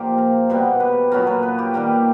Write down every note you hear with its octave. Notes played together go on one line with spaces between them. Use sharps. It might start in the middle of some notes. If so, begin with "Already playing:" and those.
Already playing: A#2 F3 A#3 G4
A#4
B2 G3 B3
B4
A#2 F#3 B3 A#4
B4
B4
G4
D#3 G3 A#3